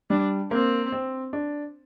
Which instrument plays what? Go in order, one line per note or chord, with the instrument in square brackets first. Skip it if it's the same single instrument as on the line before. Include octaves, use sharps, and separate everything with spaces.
[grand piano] G3 [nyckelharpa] D4
[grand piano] A#3 [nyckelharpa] C4
[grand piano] C4
D4